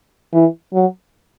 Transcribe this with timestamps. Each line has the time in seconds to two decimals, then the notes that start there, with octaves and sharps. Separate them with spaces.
0.33 E3
0.73 F#3